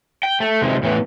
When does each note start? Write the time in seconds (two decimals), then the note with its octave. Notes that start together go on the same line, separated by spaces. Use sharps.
0.23 G5
0.40 A3
0.62 C3 D#3 G#3
0.83 A2 E3 B3